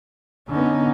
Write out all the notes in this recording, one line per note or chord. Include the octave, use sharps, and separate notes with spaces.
D3 B3 C#4 D#4